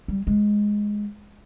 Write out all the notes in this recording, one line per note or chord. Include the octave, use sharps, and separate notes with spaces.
G3
G#3